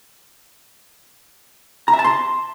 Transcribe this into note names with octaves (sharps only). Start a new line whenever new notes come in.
A#5
E5
A5
C6